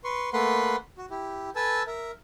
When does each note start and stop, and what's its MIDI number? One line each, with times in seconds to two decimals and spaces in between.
0.04 0.30 71
0.04 0.30 84
0.04 0.30 85
0.33 0.76 57
0.33 0.76 58
0.33 0.76 71
0.33 0.76 78
0.33 0.76 83
0.33 0.76 84
0.98 1.06 66
1.10 1.50 64
1.10 1.50 67
1.56 1.83 69
1.56 1.83 71
1.56 1.83 80
1.56 1.83 81
1.56 1.83 88
1.87 2.11 70
1.87 2.11 76